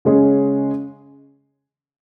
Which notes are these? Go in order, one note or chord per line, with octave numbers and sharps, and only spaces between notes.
C#3 G#3 C#4 G#4